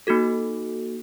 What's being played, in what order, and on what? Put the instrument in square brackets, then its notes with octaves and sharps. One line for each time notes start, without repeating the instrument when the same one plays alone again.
[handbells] A#3 D#4 F#4 A4